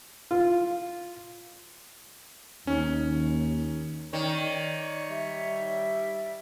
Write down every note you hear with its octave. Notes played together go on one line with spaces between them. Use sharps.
F4
D#2 C#4 D#4
D#3 C#5 D5
G3 E5